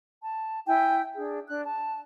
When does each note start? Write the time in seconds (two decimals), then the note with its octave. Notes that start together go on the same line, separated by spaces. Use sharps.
0.22 A5
0.66 E4 G5 G#5
1.16 D4 G#4
1.48 D4 F#6
1.65 A5